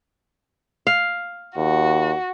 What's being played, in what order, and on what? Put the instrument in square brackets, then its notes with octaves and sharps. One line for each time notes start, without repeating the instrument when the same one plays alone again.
[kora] F5
[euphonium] D#2 [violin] F#4